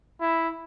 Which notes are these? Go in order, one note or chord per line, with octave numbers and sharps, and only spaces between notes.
E4